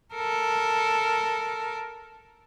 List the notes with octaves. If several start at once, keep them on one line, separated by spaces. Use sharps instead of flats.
A4 A#4